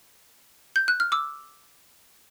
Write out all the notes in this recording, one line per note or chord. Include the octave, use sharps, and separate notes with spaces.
G6
F#6
F6
D6 E6